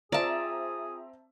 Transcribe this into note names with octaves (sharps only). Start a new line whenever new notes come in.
C4 F4 G#4 D5 E5 A5 A#5